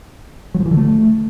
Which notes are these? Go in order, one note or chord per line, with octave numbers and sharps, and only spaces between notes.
F#3
F3
E3
D3
A3